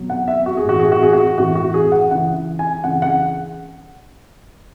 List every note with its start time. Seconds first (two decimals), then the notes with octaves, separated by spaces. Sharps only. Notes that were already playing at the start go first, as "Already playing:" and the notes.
Already playing: B2 F#3
0.10 F#5
0.28 E5
0.46 F#4
0.57 G#4
0.65 A2 E3 F#4
0.79 G#4
0.92 F#4
1.03 G#4
1.13 F#4
1.38 A2 E3 F#4
1.55 F#4
1.74 G#4
1.92 F#5
2.10 C#3 E3 F#5
2.59 G#5
2.84 C#3 E3 F#5
3.02 F#5